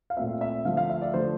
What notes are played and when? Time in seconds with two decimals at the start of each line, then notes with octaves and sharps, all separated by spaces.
0.10 F5
0.16 A#2 A3 C4 E5
0.41 E5
0.65 D3 F3 A3 F5
0.77 F5
0.90 E5
1.02 D5
1.14 D3 F3 A3 C5